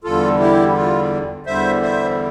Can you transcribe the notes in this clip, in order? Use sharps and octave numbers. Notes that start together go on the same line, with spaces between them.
E2 D3 G3 F4 A4
E4 G4
F4
E2 D3 G3 C5 E5
C5 E5